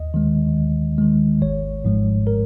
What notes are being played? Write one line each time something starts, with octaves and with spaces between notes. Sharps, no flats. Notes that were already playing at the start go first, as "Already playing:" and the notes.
Already playing: D#2 D#5
D#3 G#3
D#2
D#3 G#3
G#1 C#5
G#2 F3 G#3
A#4